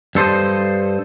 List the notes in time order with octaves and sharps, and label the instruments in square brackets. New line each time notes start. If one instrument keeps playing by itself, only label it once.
[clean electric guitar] G2 A4 C5 D#5